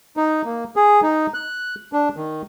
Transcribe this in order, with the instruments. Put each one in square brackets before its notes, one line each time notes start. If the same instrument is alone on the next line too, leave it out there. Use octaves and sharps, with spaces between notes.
[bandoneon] D#4
A#3
G#4
D#4
F#6
D4
D#3